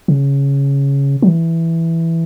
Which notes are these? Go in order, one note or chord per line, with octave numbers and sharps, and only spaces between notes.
C#3
F#3
E3